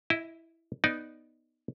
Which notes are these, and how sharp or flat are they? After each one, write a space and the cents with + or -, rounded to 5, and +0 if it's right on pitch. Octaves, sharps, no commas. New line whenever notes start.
E4 +0 D#5 +30
B3 +0 D#4 +0 D5 +0